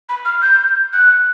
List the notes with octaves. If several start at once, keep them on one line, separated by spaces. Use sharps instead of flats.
B5
F6
G6
F#6